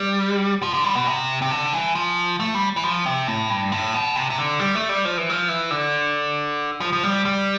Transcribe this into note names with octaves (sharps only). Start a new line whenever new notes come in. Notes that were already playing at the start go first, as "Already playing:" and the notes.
Already playing: G3
F3
D3
G3
B2
C3
C3
D3
E3
F3
A3
G3
E3
F3
C3
A2
G2
A2
B2
C3
C3
D3
G3
A3
G3
F3
E3
F3
E3
D3
F3
F3
G3
G3